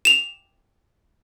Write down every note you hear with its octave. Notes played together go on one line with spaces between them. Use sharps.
E7 F7